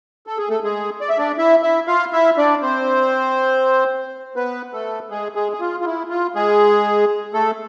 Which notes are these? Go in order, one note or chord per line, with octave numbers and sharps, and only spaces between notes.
A4
G#4
A3 A4
G#3 G#4
D5
E5
D4 D5
E4 E5
E4 E5
F4 F5
E4 E5
D4 D5
C4 C5
B3 B4
A3 A4
G#3 G#4
G#3 G#4
G#4
F4
F4
E4
F4
G#3 G#4
A3 A4